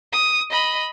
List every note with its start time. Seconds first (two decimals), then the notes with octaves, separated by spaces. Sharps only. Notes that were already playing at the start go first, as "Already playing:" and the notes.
0.13 D#6
0.51 D#5 B5